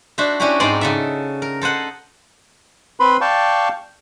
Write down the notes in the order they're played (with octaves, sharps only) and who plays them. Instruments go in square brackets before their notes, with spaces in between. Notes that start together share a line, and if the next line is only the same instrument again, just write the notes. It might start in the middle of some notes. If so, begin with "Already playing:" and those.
[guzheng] D4 F#4 C5 E5
C#4 D4 E4 F#4 G4
G#2 G#3 C4 D#4 D5 C6
C#3 A4 E5
A#4
A4 C5 D#5 F#5
[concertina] C4 B4 B5 C6
D5 F5 G5 A5 C#6